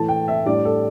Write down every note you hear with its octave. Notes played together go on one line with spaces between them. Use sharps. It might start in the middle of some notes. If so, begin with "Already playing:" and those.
Already playing: A2 E3 A3 A5
G5
E5
A2 G3 D4 D5
A4